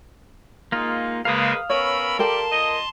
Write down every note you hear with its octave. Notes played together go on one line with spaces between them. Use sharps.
G#3 A#3 D#4 F4
C#3 G#3 A#3 A#4 B4 F5 D#6
B3 C#4 A#4 C#5 B5 E6
G3 G4 A4 A#4 D5 G5 A5 C6
A#2 D#5